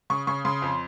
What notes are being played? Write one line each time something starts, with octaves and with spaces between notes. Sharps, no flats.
C#3 C#6
C#3 C#6
C#3 C6
F2